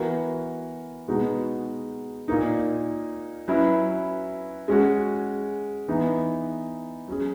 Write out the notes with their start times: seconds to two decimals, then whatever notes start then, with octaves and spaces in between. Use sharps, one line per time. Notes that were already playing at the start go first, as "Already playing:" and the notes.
Already playing: E3 B3 F#4 A#4
1.08 B2 G#3 B3 D#4 F#4
2.28 A#2 A#3 D#4
3.48 F#3 C#4 E4 B4
4.68 G#3 C#4 F#4
5.88 E3 B3 D#4
7.08 F#3 C#4 G#4